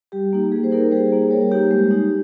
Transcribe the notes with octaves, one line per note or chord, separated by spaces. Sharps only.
G3 G4
A#3 D#4
G3 G#4
C5
A#3 D#4 G4 A#4
G3 G#4 C5
A#3 D#4
G3 A#4 C#5
A#3 D#4 G4
G#3
D#4